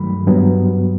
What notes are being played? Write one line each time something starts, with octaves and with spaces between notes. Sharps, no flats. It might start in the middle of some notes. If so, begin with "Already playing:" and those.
Already playing: G2 D#3 F#3 A3 B5
G2 F#3 B3